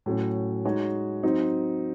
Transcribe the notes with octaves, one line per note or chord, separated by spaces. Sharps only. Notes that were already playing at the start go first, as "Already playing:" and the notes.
A2 F#3 C#4
G#3 D#4 F#4 C#5
F#3 C4 D#4